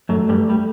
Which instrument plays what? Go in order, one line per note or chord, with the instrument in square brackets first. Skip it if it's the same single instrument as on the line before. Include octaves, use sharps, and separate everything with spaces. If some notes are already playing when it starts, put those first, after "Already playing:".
[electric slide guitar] F#2 F#3 [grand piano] A3
[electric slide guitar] G2 G3
[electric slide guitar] G3 [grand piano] A3